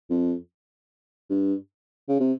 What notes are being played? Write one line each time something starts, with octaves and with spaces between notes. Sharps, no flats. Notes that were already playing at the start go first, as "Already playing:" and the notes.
F2
G2
C#3
C3